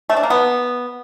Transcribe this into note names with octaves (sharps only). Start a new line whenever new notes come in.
A3
D4
A#3
B3